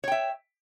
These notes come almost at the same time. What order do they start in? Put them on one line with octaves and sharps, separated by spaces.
C#5 G5 E5